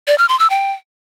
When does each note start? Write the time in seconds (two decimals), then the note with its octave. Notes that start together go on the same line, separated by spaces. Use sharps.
0.07 D5
0.18 F6
0.29 C6
0.39 E6
0.50 G5